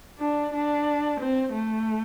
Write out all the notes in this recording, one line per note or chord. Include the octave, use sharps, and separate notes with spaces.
D4
D4
C4
A3